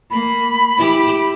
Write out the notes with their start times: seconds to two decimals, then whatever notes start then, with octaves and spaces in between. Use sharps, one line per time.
0.10 A#3 B5
0.77 E4 G4